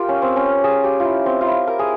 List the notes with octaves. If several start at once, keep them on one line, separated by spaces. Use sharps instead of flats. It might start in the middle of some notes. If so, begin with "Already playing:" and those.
Already playing: F4 G4 A#4
C#4
C4
C#4
G#4
G4
E4 F4
C4
F4
E4
A#4
G#4